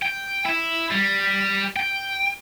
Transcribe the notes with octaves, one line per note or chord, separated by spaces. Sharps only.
G5
E4
G3
G5